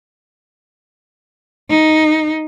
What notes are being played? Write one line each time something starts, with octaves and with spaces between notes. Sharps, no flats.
D#4